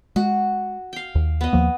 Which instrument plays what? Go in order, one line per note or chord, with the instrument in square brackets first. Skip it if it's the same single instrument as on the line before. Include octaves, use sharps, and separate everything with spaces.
[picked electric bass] G#3 [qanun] F#4
[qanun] F5 G5
[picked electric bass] D#2
[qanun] B3 D#5
[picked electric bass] D#2 F3 A#3